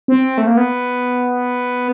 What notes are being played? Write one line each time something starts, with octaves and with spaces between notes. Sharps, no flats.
C4
A3
A#3
B3